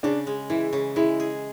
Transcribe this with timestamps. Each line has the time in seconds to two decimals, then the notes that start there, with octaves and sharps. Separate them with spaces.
0.03 C#3 D4
0.27 G#3
0.50 E3 E4
0.73 C#3
0.96 G#3 E4
1.20 G#4